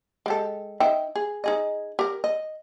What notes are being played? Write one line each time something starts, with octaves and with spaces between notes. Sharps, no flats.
G#3 G4 A4
D#4 E5 G5
G#4
D#4 G#4 D#5
G4 A#4
D#5